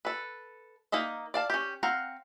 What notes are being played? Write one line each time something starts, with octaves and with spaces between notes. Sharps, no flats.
A4 B4
A#3 D#4 D#5 E5
D5 F5 A5
C#4 G4
C4 F5 F#5 A#5